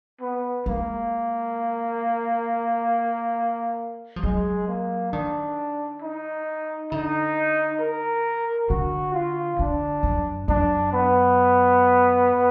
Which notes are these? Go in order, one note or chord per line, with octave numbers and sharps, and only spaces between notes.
B3
G#3 A#3
F3
F#3 G#3
A#3
D#3 D4
D#4
D3 D#4
A#4
D3 F#4
F4
D3 D4
F#2
F#2 D4
B3